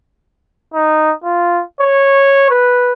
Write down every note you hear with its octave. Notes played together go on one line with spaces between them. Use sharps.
D#4
F4
C#5
B4